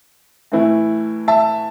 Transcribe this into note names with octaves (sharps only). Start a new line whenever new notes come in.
A2 E3 A3 E4
E5 A5